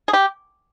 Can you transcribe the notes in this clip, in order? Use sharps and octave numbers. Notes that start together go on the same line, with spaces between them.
G#4
G4